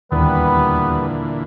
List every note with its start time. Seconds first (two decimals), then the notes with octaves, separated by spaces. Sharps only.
0.12 D#2 A#2 D3 E3 G3 B3 B4